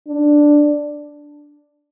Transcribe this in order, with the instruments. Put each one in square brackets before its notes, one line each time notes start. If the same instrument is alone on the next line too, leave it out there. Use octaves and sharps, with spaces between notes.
[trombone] D4